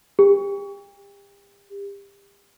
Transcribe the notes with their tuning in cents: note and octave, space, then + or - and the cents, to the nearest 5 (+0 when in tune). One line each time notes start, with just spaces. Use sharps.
G4 +35